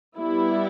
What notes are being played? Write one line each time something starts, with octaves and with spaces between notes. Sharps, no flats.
G3 B3 E4